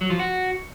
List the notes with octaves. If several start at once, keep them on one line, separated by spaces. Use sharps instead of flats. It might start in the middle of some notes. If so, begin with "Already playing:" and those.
F#3
F3
F#4